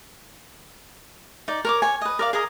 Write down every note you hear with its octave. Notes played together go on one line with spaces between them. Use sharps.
D#4 D5
A#4 C#5 D6
C#5 G#5
B4 D#5
A#4 D5 F5
G#4 A#4 D#5 A#5